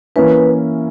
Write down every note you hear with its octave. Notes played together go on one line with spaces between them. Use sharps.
E3 A#3 C#4 E4 B4